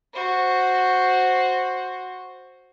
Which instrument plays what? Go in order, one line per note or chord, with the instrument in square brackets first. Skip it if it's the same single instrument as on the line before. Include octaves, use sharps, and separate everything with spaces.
[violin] F#4 C5